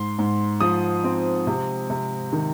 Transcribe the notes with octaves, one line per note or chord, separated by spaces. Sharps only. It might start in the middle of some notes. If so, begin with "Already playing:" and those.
Already playing: G#2 C6
G#2
F3 D#6
C4
C3
C3
D#3